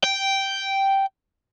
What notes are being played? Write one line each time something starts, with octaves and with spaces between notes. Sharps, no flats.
G5